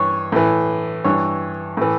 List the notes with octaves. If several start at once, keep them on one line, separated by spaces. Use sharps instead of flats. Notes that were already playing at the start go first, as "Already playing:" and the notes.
Already playing: G2 E3 C#5
A2 E3
G2 E3 C#5
A2 E3